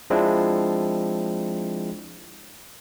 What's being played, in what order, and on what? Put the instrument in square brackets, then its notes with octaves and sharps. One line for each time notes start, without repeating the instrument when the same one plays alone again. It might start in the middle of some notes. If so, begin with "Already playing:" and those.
[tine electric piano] F3 G#3 C4 D4 E4